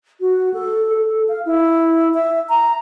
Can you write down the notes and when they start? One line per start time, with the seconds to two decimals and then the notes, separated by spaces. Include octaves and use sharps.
0.20 F#4
0.54 A4
0.94 A4
1.29 F5
1.46 E4
2.14 E5
2.49 A#5